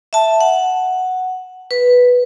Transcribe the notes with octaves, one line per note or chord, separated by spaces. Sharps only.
E5 A5
F#5
B4